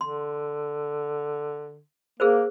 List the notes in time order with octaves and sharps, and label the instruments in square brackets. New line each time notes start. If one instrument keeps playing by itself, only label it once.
[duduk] D3 [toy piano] C6
[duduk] A#3 [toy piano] G#4 A#4 C5